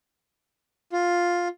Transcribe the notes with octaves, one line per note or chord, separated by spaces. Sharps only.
F4